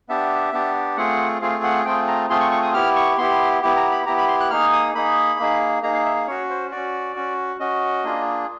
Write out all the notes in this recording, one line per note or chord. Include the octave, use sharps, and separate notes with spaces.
B3 D4 G4 E5
B3 D4 G4
A3 C4 F4 G#4 F#5
A3 C4 F4 G#4 F5
F#5
A3 C4 F4 G#4 G5
A#5
A3 C4 F4 G#4 C6
C#6
C#6
D#6
B3 E4 G4 F6
C#6
B3 E4 G4 C6
B3 E4 G4
A#5
B5
B3 E4 G4 A#5
B5
C6
F#6
A#3 D#4 G#4 F6
D#6
A#3 D#4 G#4 B5
A#3 D#4 G#4
A#3 D#4 G#4 A#5
F5
E5
F5
C#4 F#4 C#5
C5
C#4 F#4 D5
C#4 F#4
C#4 F#4 D#5
A#3 D4 F4 G#4